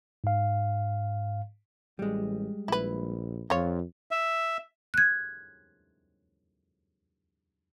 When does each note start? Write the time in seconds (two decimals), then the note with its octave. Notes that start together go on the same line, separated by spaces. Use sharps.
0.24 G#2 F5
1.99 A1 G3 G#3
2.68 A#1 E4 B4
3.50 F2 F4 C#5
4.11 E5
4.94 F#6 G#6